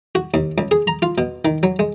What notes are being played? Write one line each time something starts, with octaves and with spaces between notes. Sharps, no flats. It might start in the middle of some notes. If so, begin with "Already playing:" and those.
F#4
D#2
C#2
G#4
A#5
F4
B2
D#3
F#3
G#3